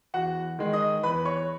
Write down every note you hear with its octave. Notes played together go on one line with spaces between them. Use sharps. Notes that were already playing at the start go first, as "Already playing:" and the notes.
E2 F#4 F#5
D#3 G#3
D#5 D#6
E2 B4 B5
C#5 C#6